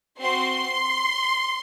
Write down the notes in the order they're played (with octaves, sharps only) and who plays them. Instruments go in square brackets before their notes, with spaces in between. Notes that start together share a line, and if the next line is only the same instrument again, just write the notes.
[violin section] C4 F#4 C6